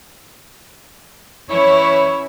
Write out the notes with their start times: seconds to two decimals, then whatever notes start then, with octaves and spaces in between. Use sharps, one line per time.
1.50 E3 C#4 E4 C#5